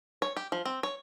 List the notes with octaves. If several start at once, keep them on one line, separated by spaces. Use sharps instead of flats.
C#5
G4
F3
C4
C#5